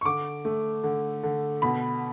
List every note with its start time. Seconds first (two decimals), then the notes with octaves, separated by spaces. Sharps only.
0.01 C#6
0.05 D3 D6
0.45 A3
0.84 D3
1.23 D3
1.62 B2 B5